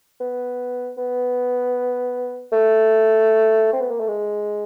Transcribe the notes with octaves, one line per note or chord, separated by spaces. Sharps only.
B3
B3
A3
C4
B3
A#3
A3
G#3